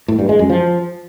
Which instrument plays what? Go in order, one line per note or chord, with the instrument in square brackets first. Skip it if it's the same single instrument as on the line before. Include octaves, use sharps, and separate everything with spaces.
[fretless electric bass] A2
G2
G#3
F#2
F3